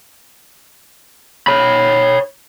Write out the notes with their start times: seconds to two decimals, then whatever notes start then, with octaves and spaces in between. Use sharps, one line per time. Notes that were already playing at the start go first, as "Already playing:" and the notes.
1.47 C#5 B5